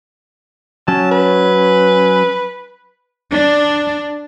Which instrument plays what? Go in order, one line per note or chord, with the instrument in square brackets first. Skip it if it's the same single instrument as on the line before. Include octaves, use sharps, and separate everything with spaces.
[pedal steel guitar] F#3 C#4 [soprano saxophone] A5
[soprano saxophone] B4
[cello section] D4